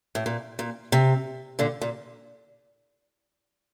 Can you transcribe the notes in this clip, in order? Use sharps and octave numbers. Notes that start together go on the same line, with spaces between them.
A2
A#2
A#2
C3
A#2 D3
A#2